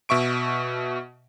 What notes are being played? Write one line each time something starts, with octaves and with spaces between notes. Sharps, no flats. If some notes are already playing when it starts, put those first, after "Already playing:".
B2 E5 C#6 D7